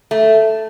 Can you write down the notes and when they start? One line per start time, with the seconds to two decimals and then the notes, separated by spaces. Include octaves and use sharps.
0.11 A3